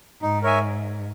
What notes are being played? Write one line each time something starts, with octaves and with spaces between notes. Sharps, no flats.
G#2 D#4
A#4 C#5 E5 G#5